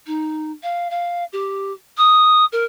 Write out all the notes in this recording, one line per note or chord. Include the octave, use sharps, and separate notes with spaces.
D#4
F5
F5
G4
D#6
A#4